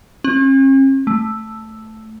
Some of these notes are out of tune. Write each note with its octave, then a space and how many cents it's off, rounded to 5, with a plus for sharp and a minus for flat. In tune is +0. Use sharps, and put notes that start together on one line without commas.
C#4 -45
A3 +0